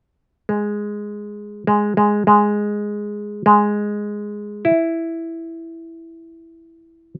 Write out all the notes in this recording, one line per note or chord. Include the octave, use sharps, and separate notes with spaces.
G#3
G#3
G#3
G#3
G#3
E4